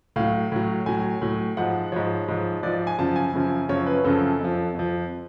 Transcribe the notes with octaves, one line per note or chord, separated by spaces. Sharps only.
A2 F#3 F5
A2 F#3
A2 F#3 G#5
A2 F#3
G#2 F3 F#5
G#2 F3 C#5
G#2 F3
G#2 F3 D5
G#5
F#2 C#3 F3 A5
G#5
F#2 C#3 F3
F#2 C#3 F3 C#5
B4
F#2 C#3 F3 A4
F2 F3
F2 F3